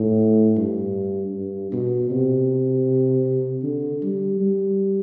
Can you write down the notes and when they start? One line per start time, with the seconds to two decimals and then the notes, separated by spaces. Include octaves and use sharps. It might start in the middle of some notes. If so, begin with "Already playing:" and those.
Already playing: A2
0.57 G2
1.34 G2
1.72 B2
2.10 C3
3.63 D3
4.02 G3
4.40 G3